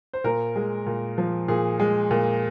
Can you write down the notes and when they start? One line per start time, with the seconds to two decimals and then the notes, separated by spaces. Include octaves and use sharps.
0.13 C5
0.24 A#2 A#4
0.56 G#3
0.86 A#2
1.18 F3
1.48 A#2 G#4
1.80 G#3
2.11 A#2